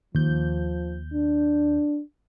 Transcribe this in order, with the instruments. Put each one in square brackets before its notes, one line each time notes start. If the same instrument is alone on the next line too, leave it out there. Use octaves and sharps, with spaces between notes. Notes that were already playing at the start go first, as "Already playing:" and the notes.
[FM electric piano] D#2 G6 [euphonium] F3
[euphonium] D4